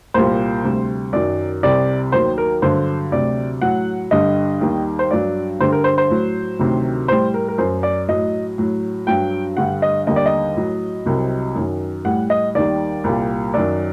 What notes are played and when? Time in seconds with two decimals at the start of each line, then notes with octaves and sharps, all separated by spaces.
0.14 C2 A#2 G3 C5
0.64 D2 C3 G3
1.13 F#2 D#3 F#3 D5
1.63 C2 C3 G3 D5
2.12 D#2 D#3 F#3 C5
2.38 A#4
2.62 G2 D3 F#3 C5
3.12 D2 C3 F#3 D5
3.62 A2 F#3 F#5
4.11 G2 D3 G3 D#5
4.61 D#2 D#3 G3
4.99 C5
5.11 G2 F#3 D5
5.59 G2 D3 G3 C5
5.72 A#4
5.84 C5
5.98 C5
6.10 A2 F#3
6.59 D2 C3 D#3 F#3
7.08 A2 G3 C5
7.34 A#4
7.48 A#4
7.58 F#2 F#3 C5
7.83 D5
8.08 A2 F#3 D#5
8.58 A2 F#3
9.07 G2 F#3 G5
9.57 G2 D3 G3 F#5
9.82 D#5
10.07 D#2 D3 G3 D#5
10.16 D5
10.26 D#5
10.56 A2 F#3
11.06 C2 C3 F#3
11.55 F#2 D#3 F#3
12.05 A2 G3 F#5
12.30 D#5
12.55 D#2 D#3 G3 D5
13.04 C2 A#2 G3
13.54 F#2 D#3 F#3 D5